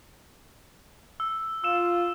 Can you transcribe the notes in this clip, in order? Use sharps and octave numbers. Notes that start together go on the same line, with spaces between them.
E6
F4 E6 E7